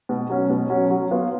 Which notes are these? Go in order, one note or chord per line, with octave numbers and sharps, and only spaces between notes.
B2
F#3 C#4
B2
F#3 C#4
F#3
B3 F4